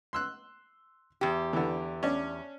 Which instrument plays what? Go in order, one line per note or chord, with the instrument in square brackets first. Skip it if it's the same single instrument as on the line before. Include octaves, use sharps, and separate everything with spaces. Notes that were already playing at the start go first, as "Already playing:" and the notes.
[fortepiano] C6 E6 F#6
[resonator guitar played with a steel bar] E2 G4
[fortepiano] D3 E3
C#4 D4